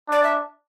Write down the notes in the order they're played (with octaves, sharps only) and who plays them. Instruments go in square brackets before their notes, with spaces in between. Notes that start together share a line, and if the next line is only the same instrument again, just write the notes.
[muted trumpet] D4 [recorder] D5
[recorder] E5